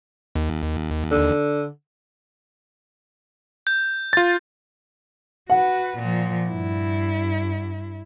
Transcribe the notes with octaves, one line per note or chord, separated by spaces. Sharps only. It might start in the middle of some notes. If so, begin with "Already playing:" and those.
D#2
D3
G6
F4 A6
F#4 B4 F#5
A#2 F3
G2 E4